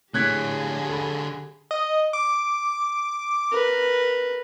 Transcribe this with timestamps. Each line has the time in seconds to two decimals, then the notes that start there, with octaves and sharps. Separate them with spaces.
0.14 A2 D3 G4 G#4 C#5 F#6 G#6 B6
0.89 A4 B5
1.71 D#5
2.13 D6
3.51 A#4 B4